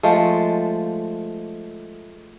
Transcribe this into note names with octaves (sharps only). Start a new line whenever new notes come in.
F3 G#3 A3